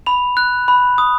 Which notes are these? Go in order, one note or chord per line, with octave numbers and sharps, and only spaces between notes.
B5 F7
F#6
B5
D#6